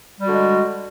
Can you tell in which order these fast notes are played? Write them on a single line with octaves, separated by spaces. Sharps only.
G3 F#4 D3 G#3